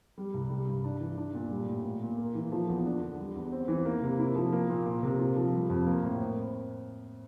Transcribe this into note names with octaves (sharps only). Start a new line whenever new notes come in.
G3
C2
G3
G2
D4
E3
D4
A#2
G3
A2
A#3
A#2
A#3
E3
F3
E2
D4
D3
G3
E2
C4
E3
A#3
C3
E4
F3
A#3
A#2
A#3
C3
F4
F3
G3
F2
A#3
A2
C4